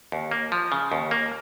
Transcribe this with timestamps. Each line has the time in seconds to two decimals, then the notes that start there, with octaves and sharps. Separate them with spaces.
0.12 D#2
0.31 A#3
0.52 F3
0.72 C#3
0.92 D#2
1.11 A#3